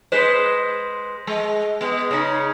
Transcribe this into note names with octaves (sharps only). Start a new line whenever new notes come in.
G#3 B4 C5
G#3
G#3 B3
C#3 D#4